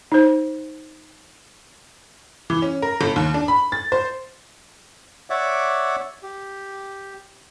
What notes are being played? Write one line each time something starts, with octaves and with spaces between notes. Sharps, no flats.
D#4 C5
E3
C#4
A#4
G1
D#2
D4
B5
A6
C5
C#5 D5 E5 F#5 D6
G4